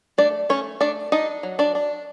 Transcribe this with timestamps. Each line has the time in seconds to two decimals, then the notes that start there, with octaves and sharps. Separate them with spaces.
0.18 A3 D4 D5
0.49 A3 C#4 C#5
0.80 A3 D4 D5
1.12 D4 D#4 D#5
1.43 F#3
1.59 D4 D5
1.75 D4